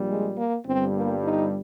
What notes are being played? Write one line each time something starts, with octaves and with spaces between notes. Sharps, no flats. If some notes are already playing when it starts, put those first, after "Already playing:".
Already playing: A#1 A#2 G3
G#3
A#3
G1 G2 G3 C4
A#3
D#4